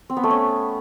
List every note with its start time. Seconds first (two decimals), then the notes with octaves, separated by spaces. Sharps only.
0.10 C4
0.17 B3
0.23 A3
0.30 C#4